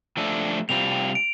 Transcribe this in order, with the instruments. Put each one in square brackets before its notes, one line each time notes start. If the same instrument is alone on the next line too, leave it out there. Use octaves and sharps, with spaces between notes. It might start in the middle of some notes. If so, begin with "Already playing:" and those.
[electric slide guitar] F3 A3 D4 A4
[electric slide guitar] C3 G3 C4 F4 [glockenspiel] F7
[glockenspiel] D7